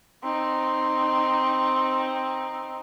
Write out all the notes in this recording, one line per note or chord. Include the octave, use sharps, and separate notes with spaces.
C4 D#4